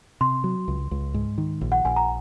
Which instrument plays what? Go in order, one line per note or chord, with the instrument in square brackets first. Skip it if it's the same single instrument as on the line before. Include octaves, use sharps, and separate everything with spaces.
[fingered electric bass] C3 [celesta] C6
[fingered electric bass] F#3
C#2
C#2
G#2
D#3
A#1
[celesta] F#5
[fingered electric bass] A#1 [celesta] G#5
[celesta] A#5